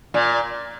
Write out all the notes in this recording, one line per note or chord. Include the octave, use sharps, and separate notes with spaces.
A#2